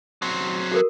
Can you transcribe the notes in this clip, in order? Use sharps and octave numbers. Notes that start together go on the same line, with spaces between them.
F#3 C4
F#4 A4 A#4